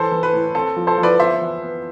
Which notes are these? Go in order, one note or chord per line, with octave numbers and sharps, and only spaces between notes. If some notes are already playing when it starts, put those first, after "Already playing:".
Already playing: E3 A4 C5
E3
B4
A2
C4 A4
F3
A4 C5
F3
B4 D5
B3 C5 E5
E3
B3